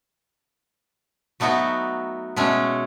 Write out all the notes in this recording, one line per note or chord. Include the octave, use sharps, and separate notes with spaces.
F#3 A3 B3 D#4 F#4
B2 G#3 A3 C#4